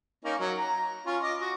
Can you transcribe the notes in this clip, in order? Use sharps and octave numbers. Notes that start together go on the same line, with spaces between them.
A#3 C#4 D#4
F#3
A#5
C#4 F4
D#5 D6
F#4